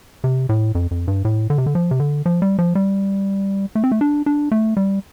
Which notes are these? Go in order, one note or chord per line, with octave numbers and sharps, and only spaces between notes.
C3
A2
F2
F2
G2
A2
D3
C3
D3
F3
C3
D3
F3
G3
F3
G3
A3
C4
A3
D4
D4
A3
G3